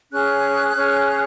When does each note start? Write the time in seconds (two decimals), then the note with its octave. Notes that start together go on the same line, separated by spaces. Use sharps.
0.11 C#4 G#4 C#5 F#6
0.75 C#4 G#4 C#5